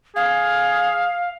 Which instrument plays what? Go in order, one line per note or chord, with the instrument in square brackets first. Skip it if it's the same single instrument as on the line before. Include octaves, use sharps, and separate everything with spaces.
[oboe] G#4 [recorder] F5